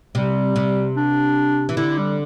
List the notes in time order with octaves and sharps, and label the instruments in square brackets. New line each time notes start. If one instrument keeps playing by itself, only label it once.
[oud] C3 [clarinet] G3
[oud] C3
[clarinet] D4
[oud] E3
[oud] D3 [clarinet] E4
[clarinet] G3